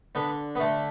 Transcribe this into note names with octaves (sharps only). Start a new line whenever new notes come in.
D3 B3
B3
D3 A3